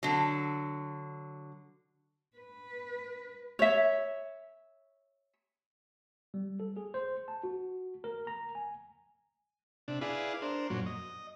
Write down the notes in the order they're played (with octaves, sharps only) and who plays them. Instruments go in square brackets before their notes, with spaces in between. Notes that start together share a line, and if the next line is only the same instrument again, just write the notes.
[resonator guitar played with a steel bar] D3 F#3
[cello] B4
[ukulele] C#5 E5
[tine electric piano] G3
A4
G#4
C5
A5
F#4
A#4
A#5
G#5
[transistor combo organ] C3 D4
E4 G#4 B4 D5 F5
D4 A#4 C5
F#2 A#2 F#3
D#5